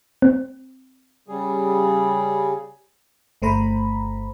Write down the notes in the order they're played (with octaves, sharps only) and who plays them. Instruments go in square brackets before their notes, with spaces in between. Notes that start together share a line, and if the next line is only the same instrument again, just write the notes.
[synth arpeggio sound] C4
[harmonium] C#3 G3 G#4
[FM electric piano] G1 A3 C5 A#5 B5